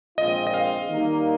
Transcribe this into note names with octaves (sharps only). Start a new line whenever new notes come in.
A#1 A#2 G#3 C4 F4 D#5
D#5
F5
D#3 G3 A#3